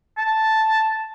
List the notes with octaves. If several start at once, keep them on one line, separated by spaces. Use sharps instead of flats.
A5